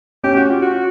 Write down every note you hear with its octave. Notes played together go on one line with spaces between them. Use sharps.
C#4 G4
F#4
F4
F#4